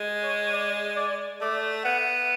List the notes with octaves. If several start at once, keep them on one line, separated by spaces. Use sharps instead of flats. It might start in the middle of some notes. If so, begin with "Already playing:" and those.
Already playing: G#3
C#5
D5
D5
A3 D5
B3 F#5